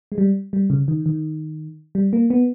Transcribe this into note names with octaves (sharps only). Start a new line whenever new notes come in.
G#3
G3
G3
C#3
D#3
D#3
G3
A#3
B3